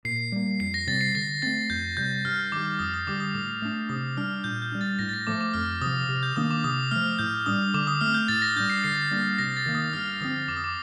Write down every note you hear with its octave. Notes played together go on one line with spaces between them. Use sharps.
A#2 C7
G3 A#3
F2 C7
A#6
C3 G3 C4 A6
C7
D3 A#6
A3 C4 A6
F2 G6
C3 G3 G6
G2 F6
D#3 G3 D6
F2 D#6
D#6
D3 G3 D6
D#6
A2 D6
A3 D4
C3 D#6
G3 D4 F6
A#2 G6
G6
G3 D4
A6
A2 A#6
A6
A#6
F3 A3 D6
D6
F2 F6
C3 F3 D#6
C3
G6
D#3 A#3 D4 D#6
D6
C3 D#6
F3 A3 F6
A2 G6
G3 D4 D#6
D3 D6
D#6
A3 C4 F6
G6
A2 A6
A#6
G3 D4 G6
C7
D3 C7
G3 A#3 D4
C3 A#6
A6
D#3 A#3
D#6
G2 F6
D3 F3 C4 D#6
F2 D6
D#6
D6